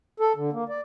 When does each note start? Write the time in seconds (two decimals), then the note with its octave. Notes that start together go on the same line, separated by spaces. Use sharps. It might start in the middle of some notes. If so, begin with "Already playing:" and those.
0.20 A4
0.36 D3
0.53 A#3
0.69 D5